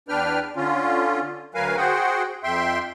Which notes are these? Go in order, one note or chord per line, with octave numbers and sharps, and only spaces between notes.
E2 D4 B4 G5 F6
D3 C#4 F4
D2 F#3 A#4 B4 F5 G#5
F#4 G#4 C5 F#5 G5
F2 E5 G5 C6